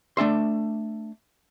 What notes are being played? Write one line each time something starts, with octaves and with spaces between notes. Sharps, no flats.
A3 D4 E5 C6